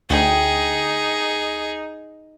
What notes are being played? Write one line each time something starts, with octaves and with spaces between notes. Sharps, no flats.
D2 D#4 G#4 G5